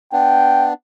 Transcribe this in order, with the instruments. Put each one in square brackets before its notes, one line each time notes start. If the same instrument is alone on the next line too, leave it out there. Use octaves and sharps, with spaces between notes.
[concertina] B3 D4 [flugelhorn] G5